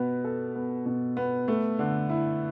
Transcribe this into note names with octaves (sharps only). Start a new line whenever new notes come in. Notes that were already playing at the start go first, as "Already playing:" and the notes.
Already playing: B2 B3
A4
B3
B2
B3
A3
D3
E4